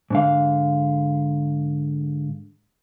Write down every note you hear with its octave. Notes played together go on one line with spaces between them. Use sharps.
G#2 D3 F5